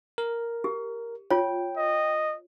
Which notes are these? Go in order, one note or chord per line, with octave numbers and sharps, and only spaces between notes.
A#4
G4
F4 C#5 G5
D#5